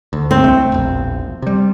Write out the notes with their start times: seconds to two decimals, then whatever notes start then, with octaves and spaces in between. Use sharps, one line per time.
0.13 D2
0.31 C4
0.44 C2 A3
0.72 E1 A#1
1.42 C3 G3